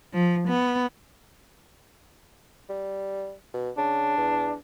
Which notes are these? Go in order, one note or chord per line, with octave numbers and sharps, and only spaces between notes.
F3
B3
G3
B2
C#3 D4
E2